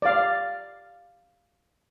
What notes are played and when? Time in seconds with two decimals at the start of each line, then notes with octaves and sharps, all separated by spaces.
0.02 D5 F5